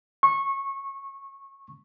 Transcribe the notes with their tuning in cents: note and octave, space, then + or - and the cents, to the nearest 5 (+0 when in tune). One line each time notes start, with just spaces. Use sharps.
C#6 -20